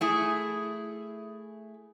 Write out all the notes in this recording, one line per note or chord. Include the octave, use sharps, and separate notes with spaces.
A3 E4 G#4